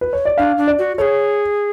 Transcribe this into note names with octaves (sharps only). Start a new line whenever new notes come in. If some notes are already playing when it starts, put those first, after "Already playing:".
B4
C#5
D5
D4 F5
D4
D5
F#4
G#4 A4 C#5